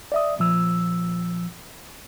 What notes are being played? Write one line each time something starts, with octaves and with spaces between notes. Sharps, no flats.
D5 E5 D#6
A#2 F3 E6